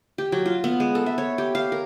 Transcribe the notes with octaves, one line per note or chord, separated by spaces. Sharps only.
G4
F#3
F4
B3
G#3
A4
E5
C#5
G4
F5
A#4